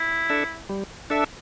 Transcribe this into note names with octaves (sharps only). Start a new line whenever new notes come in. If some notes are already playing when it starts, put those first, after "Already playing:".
Already playing: E4
D4 A4 E5
G3
D4 A4 E5